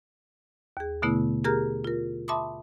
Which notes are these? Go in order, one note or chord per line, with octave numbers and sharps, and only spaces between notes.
D#2 G#4
B2 D3 A3 B3 E4
G4 G#4 A#4 A#5 F6
F4 A#4
E5 A5 B5 C6 D6 D#6